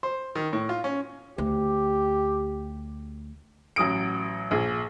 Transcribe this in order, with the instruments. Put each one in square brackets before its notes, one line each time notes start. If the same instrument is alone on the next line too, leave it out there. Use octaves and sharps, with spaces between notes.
[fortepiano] C5
D#3
A2
F4
C#4
[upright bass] D2 [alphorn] G4
[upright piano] A1 F#3 D#6 D7
A#1 G#4